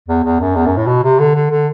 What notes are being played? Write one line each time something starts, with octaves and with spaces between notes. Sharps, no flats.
E2
E2
F#2
E2
F#2
A2
B2
C3
D3
D3
D3